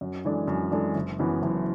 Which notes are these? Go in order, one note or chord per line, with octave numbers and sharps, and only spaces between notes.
F#2
E3 G#3 D4 A4
F#2
E3 G#3 D4 A4
F#1
F#2 E3 B3
F#1